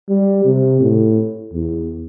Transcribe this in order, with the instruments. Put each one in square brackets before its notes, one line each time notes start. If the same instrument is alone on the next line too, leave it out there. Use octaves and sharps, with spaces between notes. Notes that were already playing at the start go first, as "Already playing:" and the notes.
[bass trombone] G3
C3
A2
E2